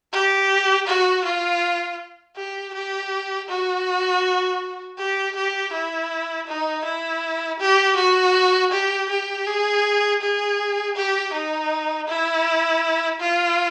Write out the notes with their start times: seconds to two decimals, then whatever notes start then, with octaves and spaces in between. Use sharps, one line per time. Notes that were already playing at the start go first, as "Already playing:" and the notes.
0.12 G4
0.87 F#4
1.25 F4
2.37 G4
2.74 G4
3.49 F#4
4.98 G4
5.35 G4
5.73 E4
6.47 D#4
6.85 E4
7.60 G4
7.97 F#4
8.72 G4
9.10 G4
9.46 G#4
10.21 G#4
10.96 G4
11.33 D#4
12.08 E4
13.20 F4